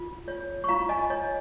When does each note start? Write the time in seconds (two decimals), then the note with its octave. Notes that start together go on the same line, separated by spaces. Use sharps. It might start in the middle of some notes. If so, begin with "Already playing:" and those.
Already playing: F4
0.28 C#5
0.64 C#6
0.68 F4 F5 A#5
0.89 D#5 G#5
1.10 C#5 D#5